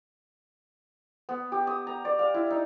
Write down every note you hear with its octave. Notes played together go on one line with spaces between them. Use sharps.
B3
G4
D#6
A#5
D5
F5
E4
D#4